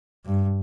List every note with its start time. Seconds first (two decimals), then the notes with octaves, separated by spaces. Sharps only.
0.25 G2